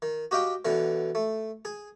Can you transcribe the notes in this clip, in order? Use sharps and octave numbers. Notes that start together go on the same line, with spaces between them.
D#3
F#4 G4 D#5 F5 G5
B2 D3 E3
A3
G#4